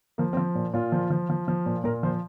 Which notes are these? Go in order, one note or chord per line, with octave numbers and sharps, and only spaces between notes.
F3 A#3
C4
F3
A#2
A#2 F4
F3
F3
F3
F3
A#2
A#2 A#4
F3 C5